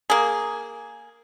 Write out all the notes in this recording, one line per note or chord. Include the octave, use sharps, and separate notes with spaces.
A#3 G#4